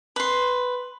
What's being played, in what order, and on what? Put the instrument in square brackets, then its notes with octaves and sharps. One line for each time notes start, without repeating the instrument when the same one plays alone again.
[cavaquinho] B4 C6